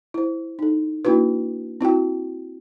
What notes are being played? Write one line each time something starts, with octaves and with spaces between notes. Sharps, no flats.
E4 C5
D#4 A4
A#3 D4 E4 F#4 B4
C4 E4 F#4 G5